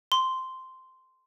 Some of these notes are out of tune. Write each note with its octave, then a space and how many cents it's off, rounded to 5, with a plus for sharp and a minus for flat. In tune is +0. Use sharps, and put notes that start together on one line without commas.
C6 -10